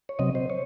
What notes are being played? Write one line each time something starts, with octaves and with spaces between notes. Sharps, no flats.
C#5
C3 F#3 C4 D#5
C5
C#5